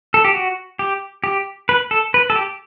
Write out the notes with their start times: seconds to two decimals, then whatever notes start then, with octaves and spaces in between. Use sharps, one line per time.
0.14 A4
0.25 G4
0.34 F#4
0.79 G4
1.24 G4
1.69 B4
1.91 A4
2.14 B4
2.30 A4
2.36 G4